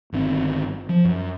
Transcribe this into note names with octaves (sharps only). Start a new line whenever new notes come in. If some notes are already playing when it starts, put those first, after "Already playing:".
G1 D#3 C4
F3
F#2